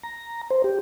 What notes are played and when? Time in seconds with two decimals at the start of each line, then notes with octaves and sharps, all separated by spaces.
0.03 A#5
0.50 C5
0.64 G4